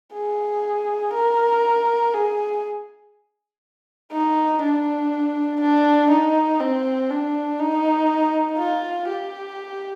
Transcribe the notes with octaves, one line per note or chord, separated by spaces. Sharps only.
G#4
A#4
G#4
D#4
D4
D4
D#4
C4
D4
D#4
F4
G4